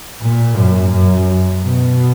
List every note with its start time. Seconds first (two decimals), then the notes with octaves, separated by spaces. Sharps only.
0.21 A#2
0.56 F#2
0.92 F#2
1.63 B2